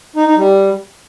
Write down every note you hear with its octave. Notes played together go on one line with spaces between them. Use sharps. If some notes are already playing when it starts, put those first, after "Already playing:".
D#4
D#4
G3